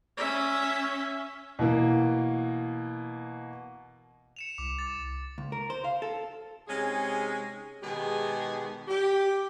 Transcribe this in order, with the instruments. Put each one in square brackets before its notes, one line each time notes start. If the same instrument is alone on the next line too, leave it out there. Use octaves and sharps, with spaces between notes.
[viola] C#4 E5
[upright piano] B2 E3 A#3
[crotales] C#7 E7 F7
[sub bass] C2 [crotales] D6
[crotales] A6
[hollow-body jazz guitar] C#2
A#4
C5
F5
A4
[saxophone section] C3 G#3 C#4 D#4 G#4
B2 D#3 G#3 D#4 G4 G#4
G4